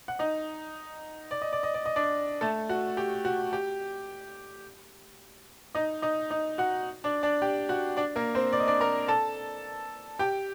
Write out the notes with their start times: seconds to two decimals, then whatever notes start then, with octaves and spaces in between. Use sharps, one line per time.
0.08 F#5
0.19 D#4 D#5
1.31 D5
1.42 D#5
1.53 D5
1.63 D#5
1.74 D5
1.86 D#5
1.96 D4 D5
2.41 A3 A4
2.69 F#4
2.97 G4
3.25 F#4
3.53 G4
5.75 D#4 D#5
6.02 D#4 D#5
6.30 D#4 D#5
6.58 F#4 F#5
7.04 D4 D5
7.23 D4 D5
7.42 G4 G5
7.69 F#4 F#5
7.97 D4 D5
8.16 A#3 A#4
8.35 C4 C5
8.53 D5
8.60 D#5
8.67 D4 D5
8.81 A#4 A#5
9.08 A4 A5
10.19 G4 G5